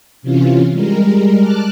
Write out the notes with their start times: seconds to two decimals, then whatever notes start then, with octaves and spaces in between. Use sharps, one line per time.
0.22 C3 E3 C#4 F4
0.72 G3 G#3 A#4
1.41 A5 D6 F6 F#6